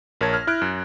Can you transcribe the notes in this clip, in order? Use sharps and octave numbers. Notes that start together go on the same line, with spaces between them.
A#1 A#4 C#5 A5 G#6 A#6
F6
E4 F6 F#6 D7
F#2